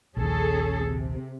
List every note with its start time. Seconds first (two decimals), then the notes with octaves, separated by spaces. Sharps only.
0.17 A#1 D#2 C#4 G#4 A4
0.86 C3